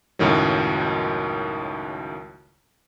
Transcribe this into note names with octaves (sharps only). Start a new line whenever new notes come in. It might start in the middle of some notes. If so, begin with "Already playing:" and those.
C#2 F#2 A2 D#3 F#3